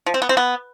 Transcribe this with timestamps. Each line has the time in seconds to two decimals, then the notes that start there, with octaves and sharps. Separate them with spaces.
0.06 F3
0.14 C4
0.22 B3
0.29 C4
0.37 B3